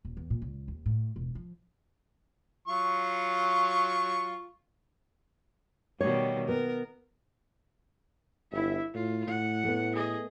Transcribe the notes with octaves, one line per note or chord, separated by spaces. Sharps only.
D#1
E2
A#2
C#2
D#2
A2
E1
F3
F#3 F4 C#6
B2 D#3 G3 C#5
B3 A#4
G1 E4 E5
A2 F4
A2 F#5
A3 B3
G#4 D#5